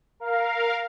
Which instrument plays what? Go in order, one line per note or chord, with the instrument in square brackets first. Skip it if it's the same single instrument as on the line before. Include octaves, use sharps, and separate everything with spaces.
[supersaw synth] A#4 F5